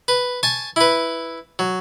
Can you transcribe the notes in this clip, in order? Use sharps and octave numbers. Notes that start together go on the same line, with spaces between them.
B4
G#5 A5 C#6
E4 B4
F#3